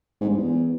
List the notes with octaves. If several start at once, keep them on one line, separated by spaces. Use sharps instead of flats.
G#2
G2
E2